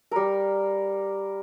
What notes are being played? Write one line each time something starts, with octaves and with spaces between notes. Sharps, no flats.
G3 A#4